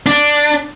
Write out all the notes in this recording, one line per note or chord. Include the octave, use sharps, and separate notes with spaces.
D4